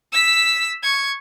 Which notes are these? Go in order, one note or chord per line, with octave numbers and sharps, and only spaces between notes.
E6 B6
C#6 G#6